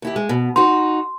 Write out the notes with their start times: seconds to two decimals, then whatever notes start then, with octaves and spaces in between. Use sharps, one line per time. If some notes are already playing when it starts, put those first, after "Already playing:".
0.02 D#2 E4 G4
0.16 G#3
0.29 B2
0.56 D#4 F#4 C6